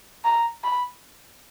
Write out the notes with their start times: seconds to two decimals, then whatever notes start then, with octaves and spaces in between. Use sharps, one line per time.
0.24 A#5
0.64 B5